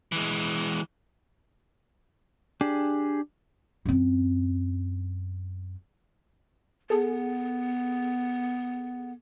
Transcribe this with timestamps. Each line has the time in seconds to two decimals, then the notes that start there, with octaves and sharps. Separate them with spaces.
0.12 E3 G#3
2.61 D4 G4 G#4
3.86 F#2 C4
6.90 B3 G#4 A4